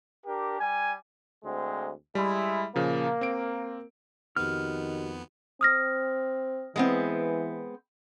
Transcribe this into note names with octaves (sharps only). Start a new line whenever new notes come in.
D4 G4 A#4
G3 G#5
D2 G#3 C4
G3 G#3 E4
A#2 C#3 F3 A#3
C4 D7
F2 D#3 B3 F#4 G4 F6
C4 D#6 F6 A#6
E3 G#3 B3 C4